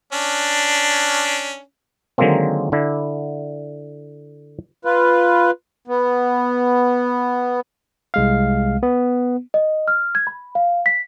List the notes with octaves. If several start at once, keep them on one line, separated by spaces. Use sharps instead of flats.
C#4 D4
D3 D#3 F#3 G#3 A#3 C4
D3 D4 E4
F4 B4
B3
C2 G#3 F5
B3
D#5
F6
G#6
B5
F5
B6